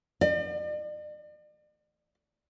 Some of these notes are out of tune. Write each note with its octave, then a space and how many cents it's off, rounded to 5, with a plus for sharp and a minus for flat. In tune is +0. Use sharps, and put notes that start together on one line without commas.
D5 +45